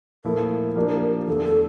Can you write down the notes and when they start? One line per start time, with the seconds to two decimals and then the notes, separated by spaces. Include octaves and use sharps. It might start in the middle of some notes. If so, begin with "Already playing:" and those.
0.24 A#2 F3 A3 E4 A#4
0.76 F3 A#3 D4 G4 D5
1.28 E2 D3 A3 A4
1.45 A4